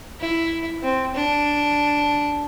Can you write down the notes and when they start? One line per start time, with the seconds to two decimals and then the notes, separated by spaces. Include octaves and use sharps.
0.20 E4
0.83 C4
1.15 D4